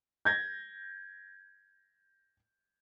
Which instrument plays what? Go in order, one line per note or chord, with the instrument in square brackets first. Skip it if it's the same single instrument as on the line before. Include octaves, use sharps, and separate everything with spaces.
[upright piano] G6 G#6 A#6